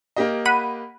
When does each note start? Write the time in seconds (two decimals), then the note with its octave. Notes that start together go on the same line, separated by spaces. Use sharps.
0.16 A#3 G4 D#5
0.45 F#5 B5 D#7